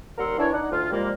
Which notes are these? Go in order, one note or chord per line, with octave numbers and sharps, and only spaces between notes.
D#2 G3 A#4 F#5 C6 E6
E3 D4 C#5
D4 D#4 F#5
D2 F4
A#2 F3 G3 G#3 A#3